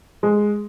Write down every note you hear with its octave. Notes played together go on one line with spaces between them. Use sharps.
G#3